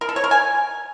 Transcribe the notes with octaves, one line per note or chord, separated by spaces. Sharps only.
A#4
A4
C#5
A#4
G#5